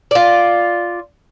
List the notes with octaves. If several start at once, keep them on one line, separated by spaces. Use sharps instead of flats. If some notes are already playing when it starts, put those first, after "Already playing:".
F4 D5